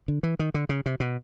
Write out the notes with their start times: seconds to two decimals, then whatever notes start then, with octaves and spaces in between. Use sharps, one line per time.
0.08 D3
0.23 E3
0.39 D#3
0.54 D3
0.69 C#3
0.86 C3
1.00 B2